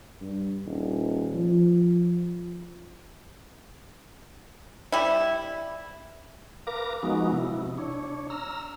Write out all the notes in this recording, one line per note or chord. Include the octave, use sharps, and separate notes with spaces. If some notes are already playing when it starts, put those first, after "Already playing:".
G2
D#1
F3
G3 E4
A#4 B4 F5 D6 A#6
F3 G#3 B3 D#4 F#4
C3 E4
D4 C#5
A#5 E6 F6